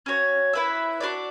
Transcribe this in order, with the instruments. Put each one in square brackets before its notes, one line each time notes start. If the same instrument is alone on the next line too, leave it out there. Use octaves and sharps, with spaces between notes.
[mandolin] C#4 F#4 C#5
E4 B4 E5
D4 F#4 B4 D5